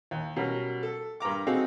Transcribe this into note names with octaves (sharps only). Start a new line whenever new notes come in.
D#2
B2 F#3 G3 C#4 A#4
A4
G2 A#4 A#5 D6
C4 D#4 F#4 G#4 A4 F5